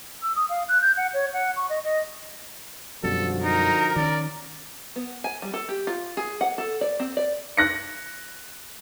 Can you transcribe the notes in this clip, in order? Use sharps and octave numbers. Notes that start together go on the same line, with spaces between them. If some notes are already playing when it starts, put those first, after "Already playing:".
E6
D#6
F5
F#6
G6
F#5
C#5
F#5
C#6
D#5
D#5
F#2 B2 D3 F3 G3 F#4 A4
D#4 A#4
D#3 C#4 D5
B3
G#5
G3
A4
G4
F4
G#4
F#5
A4
D5
C4
D5
F#6 A#6 C#7